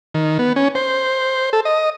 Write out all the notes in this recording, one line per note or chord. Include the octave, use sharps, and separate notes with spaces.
D#3
B3
C#4
C5
A4
D#5